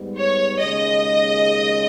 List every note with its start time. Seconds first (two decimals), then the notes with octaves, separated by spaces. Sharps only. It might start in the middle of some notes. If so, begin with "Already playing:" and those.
Already playing: G#2 G3 B3
0.18 C#5
0.60 D#2 C#3 G#3 D#5